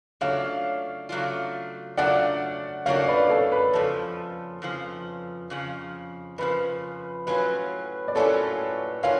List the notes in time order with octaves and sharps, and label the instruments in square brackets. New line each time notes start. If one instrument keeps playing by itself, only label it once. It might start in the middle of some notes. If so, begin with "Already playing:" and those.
[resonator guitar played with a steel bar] C#3 F#3 A3 D4 F4 [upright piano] C#5 F5
[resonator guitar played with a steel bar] C#3 F#3 A3 D4 F4
[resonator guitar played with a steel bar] C#3 F#3 A3 D4 F4 [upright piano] D5 F#5
[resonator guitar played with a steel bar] C#3 F#3 A3 D4 F4 [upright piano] C#5 F5
[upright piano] B4 D5
A4 C#5
B4
[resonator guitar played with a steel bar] F2 C#3 F3 [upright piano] A4
[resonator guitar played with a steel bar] F2 C#3 F3
F2 C#3 F3
[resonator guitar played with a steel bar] F2 C#3 F3 [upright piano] B4
[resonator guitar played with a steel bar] A2 F#3 C#4 F4 [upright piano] B4
[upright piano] D5
[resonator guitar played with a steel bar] A2 F#3 C#4 F4 [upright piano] A4 C#5
[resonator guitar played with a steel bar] A2 F#3 C#4 F4 [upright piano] C#5 F5